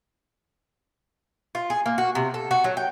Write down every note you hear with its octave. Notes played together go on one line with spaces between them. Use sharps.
F4
G#4
A#3
F#4
C3
A4
F#4
F#3
G5